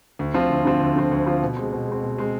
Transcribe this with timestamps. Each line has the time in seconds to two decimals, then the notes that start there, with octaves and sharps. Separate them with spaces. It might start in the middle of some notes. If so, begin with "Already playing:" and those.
0.19 D2
0.34 D3 F3 C4 F4
0.50 D2
0.65 D3 F3 C4 F4
0.80 D2
0.96 D3 F3 C4 F4
1.11 D2
1.26 D3 F3 C4 F4
1.42 B2
1.56 G#3 C4
1.72 B2
1.88 G#3 C4
2.03 B2
2.18 G#3 C4